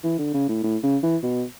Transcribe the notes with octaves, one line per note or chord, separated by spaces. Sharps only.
E3
D3
C#3
A2
A2
C#3
E3
B2